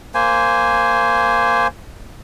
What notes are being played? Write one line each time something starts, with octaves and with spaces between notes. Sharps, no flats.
A#3 C5 G#5